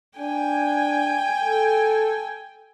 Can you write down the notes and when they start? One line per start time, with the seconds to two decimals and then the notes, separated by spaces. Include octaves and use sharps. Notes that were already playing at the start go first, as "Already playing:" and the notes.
0.18 D4 G5 G#5
1.43 A4